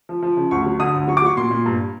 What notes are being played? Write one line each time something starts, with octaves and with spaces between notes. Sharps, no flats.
F3
F3
C#3
D2 C#6
F#3
D3 D#6
D2
F#3 C#6
D6
F#3 C#6
A#2 C6
A#2
G2